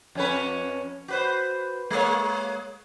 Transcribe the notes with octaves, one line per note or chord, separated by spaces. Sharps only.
F2 C#4 B4
F#4 B4 C5
G#3 A#3 C#5